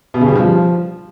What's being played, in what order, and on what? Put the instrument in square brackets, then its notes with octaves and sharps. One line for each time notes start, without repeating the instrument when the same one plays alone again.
[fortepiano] B2
C#3
G3
F3